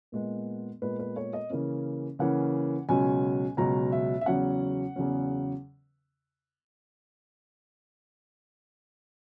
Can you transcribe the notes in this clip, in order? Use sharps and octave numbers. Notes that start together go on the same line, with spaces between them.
A#2 G#3 B3
A#2 G#3 B3 B4
B4
C#5
D#5
C#3 E3 A#3 C#4
C#3 E3 A#3 C#4 F#5
C#2 B2 F#3 C#4 G#5
C#2 B2 F#3 C#4 A#5
E5
E5
E2 C#3 F#3 C#4 F#5
E2 C#3 F#3 C#4